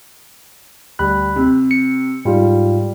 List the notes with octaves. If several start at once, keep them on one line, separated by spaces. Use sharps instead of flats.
D2 G3 B5 F#6
C3
C#7
G#2 G3 F4